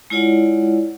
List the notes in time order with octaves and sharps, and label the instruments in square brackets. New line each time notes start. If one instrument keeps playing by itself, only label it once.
[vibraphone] G#3 E4 F4 C#5 D5 F#5